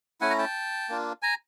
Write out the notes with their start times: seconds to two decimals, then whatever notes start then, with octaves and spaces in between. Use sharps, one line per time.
0.21 A3 C#4 E4 F#5 G#5
0.30 A#5
0.38 G5 A5
0.89 A#3 D4 F4
1.22 G#5 A#5